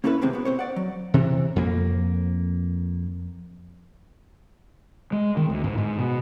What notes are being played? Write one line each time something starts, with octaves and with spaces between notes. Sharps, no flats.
A#3 C#4 E4 A4 B4
D#2 G#2 C3 G#3 C4
B2 B3
C4 C5 C#5
D5 F#5
F#3
C3 E3
F2 A#3
G#3
D#3
D2
G#2
G#2
B2